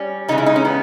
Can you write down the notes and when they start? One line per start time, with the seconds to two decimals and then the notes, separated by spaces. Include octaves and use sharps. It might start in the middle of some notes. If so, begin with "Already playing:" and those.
Already playing: G3 C#4
0.28 C#3 E3 G#3 D#4
0.38 E4
0.46 D#4
0.56 C#4
0.65 B3